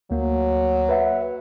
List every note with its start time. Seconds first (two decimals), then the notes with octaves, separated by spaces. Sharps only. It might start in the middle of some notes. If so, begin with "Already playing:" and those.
0.11 D2 F#3 A#3
0.89 B4 E5 F#5